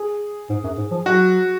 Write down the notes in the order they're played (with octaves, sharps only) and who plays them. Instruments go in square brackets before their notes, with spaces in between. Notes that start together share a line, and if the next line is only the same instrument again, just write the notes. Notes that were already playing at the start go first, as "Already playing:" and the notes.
Already playing: [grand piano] G#4
[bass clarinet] G#2
F#2
G#2
F3
[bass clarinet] F#3 [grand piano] F#4